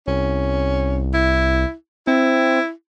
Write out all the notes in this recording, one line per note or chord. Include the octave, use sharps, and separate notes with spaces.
C2 C#4
E4
C4 E4